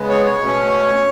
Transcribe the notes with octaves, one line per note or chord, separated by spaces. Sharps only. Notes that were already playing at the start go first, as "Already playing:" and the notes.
Already playing: C#3 G#3 B3
C#5
C#5
B2 A3 C#4